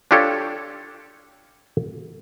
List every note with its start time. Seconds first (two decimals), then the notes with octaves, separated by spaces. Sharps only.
0.11 D4 F4 G4 A4 C#5